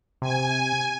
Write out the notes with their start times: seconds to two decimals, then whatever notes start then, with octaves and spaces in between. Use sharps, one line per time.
0.22 C3 G#5